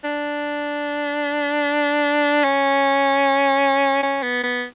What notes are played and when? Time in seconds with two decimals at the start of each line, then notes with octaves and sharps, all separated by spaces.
0.04 D4
2.44 C#4
4.03 C#4
4.23 B3
4.43 B3